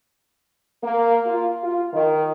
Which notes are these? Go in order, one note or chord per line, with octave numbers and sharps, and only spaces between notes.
A#3
F4
F4
D#3